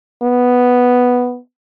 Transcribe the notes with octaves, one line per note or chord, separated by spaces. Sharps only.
B3